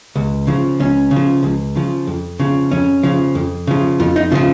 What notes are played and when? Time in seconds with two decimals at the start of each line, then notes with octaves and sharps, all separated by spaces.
0.16 C#2
0.47 C#3 F3
0.80 C#2 C#4
1.11 C#3
1.16 F3
1.43 C#2
1.76 C#3 F3
2.07 F2
2.40 C#3 F3
2.71 F2 C#4
3.03 C#3 F3
3.35 F2
3.67 C#3 F3
4.00 F2 F4
4.16 D#4
4.32 C#3 F3 F4